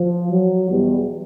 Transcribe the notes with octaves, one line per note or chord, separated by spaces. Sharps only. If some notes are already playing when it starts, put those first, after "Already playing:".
Already playing: F3
F#3
E2 B2 G3